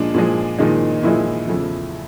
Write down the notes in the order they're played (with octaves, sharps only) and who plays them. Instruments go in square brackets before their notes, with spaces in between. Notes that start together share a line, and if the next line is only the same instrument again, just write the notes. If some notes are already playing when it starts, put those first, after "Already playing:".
Already playing: [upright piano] A#2 F3 G#3 D4
A#2 F3 G#3
A#2 D#3 F3 G#3 D#4
A#2 E3 F3 G#3 E4
E2 C#3 F3 A3